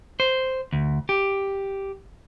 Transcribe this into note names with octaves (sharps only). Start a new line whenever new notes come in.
C5
D2
G4